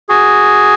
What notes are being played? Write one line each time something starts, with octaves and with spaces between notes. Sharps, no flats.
F#4 G#4